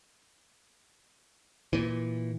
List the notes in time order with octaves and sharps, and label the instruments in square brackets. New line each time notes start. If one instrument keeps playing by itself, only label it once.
[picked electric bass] A#2 E3